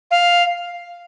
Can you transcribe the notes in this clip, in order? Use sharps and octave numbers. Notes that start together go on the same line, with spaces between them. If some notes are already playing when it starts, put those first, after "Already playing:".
F5